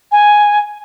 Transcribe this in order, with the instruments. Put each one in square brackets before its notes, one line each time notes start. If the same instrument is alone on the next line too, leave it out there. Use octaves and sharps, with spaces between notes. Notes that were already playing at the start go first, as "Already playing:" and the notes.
[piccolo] G#5